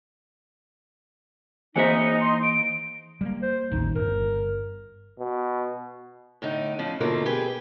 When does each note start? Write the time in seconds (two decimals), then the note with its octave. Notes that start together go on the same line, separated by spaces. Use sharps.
1.76 E3 A#3 D#4 G#4 C5 E5 G#5 C#7
2.21 C6
2.43 D7
3.21 G3 A3 A#3
3.42 C5
3.72 A1 D#2 D#4
3.95 G1 A#4
5.19 B2
6.42 A2 D3 D#4
6.79 C#3 F3 C#4
7.00 G#2 B2 D3 F3 A3 A#3
7.26 G4 G#4 B4